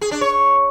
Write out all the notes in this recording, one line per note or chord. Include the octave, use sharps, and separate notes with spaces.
G#4
D4
C#5